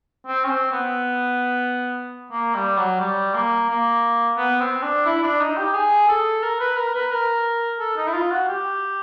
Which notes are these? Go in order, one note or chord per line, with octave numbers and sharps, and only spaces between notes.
C4
C#4
C4
B3
A#3
G3
F#3
G3
A#3
A#3
B3
C4
D4
E4
D4
D#4
G4
G#4
A4
A#4
B4
A#4
B4
A#4
A4
D#4
E4
F4
F#4
G4